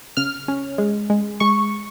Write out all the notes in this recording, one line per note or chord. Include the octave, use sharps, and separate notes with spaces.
C#3 F6
C#4
G#3
G#3
G#3 C#6